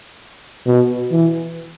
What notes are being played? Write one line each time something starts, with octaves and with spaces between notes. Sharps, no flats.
B2
E3